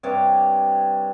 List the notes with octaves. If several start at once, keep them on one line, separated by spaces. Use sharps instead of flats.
G2 C3 C#5 D6